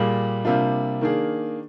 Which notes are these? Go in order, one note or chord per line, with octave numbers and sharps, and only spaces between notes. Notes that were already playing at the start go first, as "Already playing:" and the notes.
Already playing: A#2 G3 A#3 F4 G#4
C3 G3 A#3 D4 F4
D#3 A#3 D4 G#4